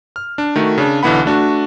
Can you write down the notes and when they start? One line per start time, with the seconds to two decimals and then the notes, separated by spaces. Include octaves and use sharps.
0.16 F6
0.38 D4
0.56 D#3 A3 F#4
0.78 C#3 D4
1.03 B1 D3 E3 B3 F#5 B5
1.26 A3 D4 F#4